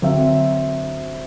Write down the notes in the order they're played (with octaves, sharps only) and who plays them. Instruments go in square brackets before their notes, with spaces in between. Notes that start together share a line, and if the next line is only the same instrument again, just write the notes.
[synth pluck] D3 F#3 [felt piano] C4 E5